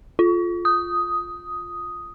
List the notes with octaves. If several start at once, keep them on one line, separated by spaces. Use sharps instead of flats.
F4
D#6